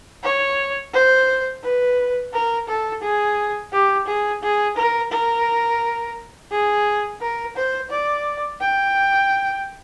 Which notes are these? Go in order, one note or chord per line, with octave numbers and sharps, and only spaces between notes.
C#5
C5
B4
A#4
A4
G#4
G4
G#4
G#4
A#4
A#4
G#4
A#4
C5
D5
G5